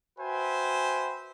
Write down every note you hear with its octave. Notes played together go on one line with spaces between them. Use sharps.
F#4 B4 C5 E5 G5 G#5